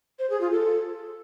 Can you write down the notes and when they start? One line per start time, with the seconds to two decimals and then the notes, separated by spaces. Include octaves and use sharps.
0.19 C5
0.30 G#4
0.40 F4
0.51 A4